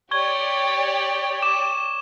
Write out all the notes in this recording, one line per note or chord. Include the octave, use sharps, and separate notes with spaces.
G4 C#5 D5 C#6 G#6 G7
D6 E7